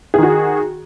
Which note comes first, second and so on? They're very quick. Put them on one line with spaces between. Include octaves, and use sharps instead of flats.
G#4 D#3 F#4